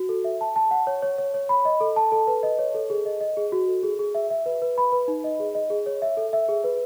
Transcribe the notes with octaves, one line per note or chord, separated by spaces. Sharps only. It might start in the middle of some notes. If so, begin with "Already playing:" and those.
Already playing: F#4
A4
E5
A5
A5
F#5
C#5
C#5
C#5
C#5
B5
D#5
A4
A5
A4
B4
D#5
C#5
A4
G#4
D#5
D#5
G#4
F#4
A4
G#4
G#4
E5
E5
B4
B4
B5
B4
D#4
D#5
G#4
D#5
G#4
C#5
E5
A4
E5
G#4
B4